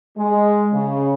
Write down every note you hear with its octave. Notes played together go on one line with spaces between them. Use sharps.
G#3
C#3